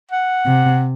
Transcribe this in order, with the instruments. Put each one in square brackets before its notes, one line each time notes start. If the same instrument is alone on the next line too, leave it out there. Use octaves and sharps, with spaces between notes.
[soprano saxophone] F#5
[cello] C3